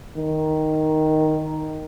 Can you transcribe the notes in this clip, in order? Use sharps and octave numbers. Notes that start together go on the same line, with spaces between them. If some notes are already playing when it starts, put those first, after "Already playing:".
D#3